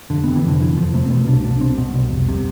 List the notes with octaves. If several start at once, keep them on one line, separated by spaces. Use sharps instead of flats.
F1 D3
C3 B3
E3
F2 D3
F1 E3
F1 F3
C3 A3
C4
B2 B3
C2 D4
B2 D4
C2 C4
B2
C2
F1
C3